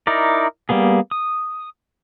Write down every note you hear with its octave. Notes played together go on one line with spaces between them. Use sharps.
D#4 E4 A#4 D5
G3 A#3 B3 G#4
D#6